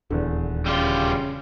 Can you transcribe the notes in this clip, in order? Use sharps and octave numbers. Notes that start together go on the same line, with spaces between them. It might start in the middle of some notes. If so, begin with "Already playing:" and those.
D#1 E2 D3
C#3 G3 F4